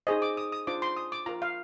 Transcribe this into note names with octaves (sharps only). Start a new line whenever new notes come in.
D#4 G#4 C5 D#5
D6
D#6
D#6
D4 F4 C5 D6
C6
D#6
D6
F4 A#4 A#5
F5